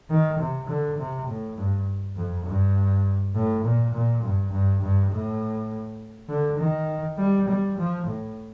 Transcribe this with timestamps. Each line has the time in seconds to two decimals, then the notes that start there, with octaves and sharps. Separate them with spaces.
0.10 D#3
0.39 C3
0.68 D3
0.98 C3
1.28 A2
1.58 G2
2.16 F2
2.46 G2
3.35 A2
3.65 A#2
3.94 A#2
4.23 G2
4.52 G2
4.82 G2
5.12 A2
6.29 D3
6.59 D#3
7.18 G3
7.48 G3
7.78 F3
8.06 A2